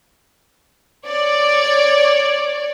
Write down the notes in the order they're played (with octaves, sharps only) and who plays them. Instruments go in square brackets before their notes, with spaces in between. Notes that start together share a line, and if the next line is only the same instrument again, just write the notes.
[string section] C#5 D5